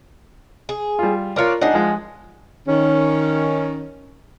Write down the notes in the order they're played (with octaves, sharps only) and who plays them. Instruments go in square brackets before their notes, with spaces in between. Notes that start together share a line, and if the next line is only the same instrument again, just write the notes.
[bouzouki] G#4
[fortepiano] G3 F4
[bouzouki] D4 C#5 [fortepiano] F4 A#4 D5
[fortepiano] D4 D#4 D#5 [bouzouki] G#4 F#5
[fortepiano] F3 G#3
[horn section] D#3 C#4